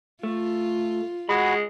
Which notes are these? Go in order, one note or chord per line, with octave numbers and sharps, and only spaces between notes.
A3 F4
G#3 F#4 G#4 F#5 B5